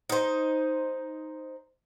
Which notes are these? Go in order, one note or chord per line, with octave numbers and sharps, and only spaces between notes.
D#4 C5